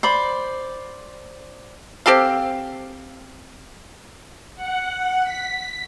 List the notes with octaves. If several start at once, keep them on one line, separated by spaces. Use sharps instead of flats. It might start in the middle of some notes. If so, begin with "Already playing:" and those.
C5 D5 B5
C4 G4 A4 F5
F#5
B6